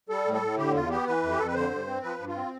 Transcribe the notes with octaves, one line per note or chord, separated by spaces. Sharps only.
G3 A4
A2
A4
A2
D3 G4
E2 F4
B3 G4
E3 B4
F2
G4
F2 A4
B4
D3 C5
G2
C4
F3 B4
G2
F4
C4